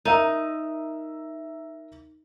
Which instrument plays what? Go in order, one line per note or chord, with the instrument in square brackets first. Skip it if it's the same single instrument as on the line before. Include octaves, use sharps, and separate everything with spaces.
[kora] D#4 [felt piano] A#4 E5 A#5